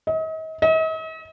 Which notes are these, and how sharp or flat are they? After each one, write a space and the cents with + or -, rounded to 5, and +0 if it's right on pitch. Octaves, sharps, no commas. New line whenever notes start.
D#5 +40
D#5 +45